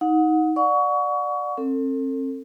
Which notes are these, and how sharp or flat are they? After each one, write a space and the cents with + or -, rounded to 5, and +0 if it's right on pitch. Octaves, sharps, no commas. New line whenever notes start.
D#4 +20 F#5 -25
D5 +10 F#5 -35 C#6 +25
C4 +35 A4 +35